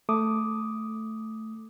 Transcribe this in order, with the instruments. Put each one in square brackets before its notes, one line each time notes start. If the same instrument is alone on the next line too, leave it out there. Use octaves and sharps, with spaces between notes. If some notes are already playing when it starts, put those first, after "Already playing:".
[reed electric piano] A3 D6 D#6